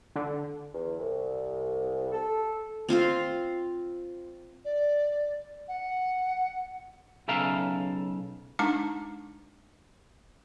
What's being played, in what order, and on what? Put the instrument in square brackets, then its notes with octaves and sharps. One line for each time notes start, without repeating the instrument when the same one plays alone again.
[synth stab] D3
[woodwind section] E2
C2
A4
[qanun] C4 F4 C5 F5
[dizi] D5
F#5
[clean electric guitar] B1 C#3 A4 E5 F5 A#5
[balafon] G#3 D4 D#4 A5 A#5 D6